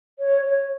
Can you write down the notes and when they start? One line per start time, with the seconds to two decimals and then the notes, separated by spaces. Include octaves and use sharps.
0.19 C#5
0.42 C#5